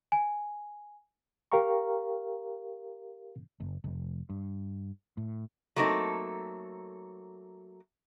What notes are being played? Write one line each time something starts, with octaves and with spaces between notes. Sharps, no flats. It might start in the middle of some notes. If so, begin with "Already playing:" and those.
G#5
G4 A#4 F5 G5 A#5 C#6
F#1
F1
G2
A2
F#3 A3 A#3 C4 D#4 A4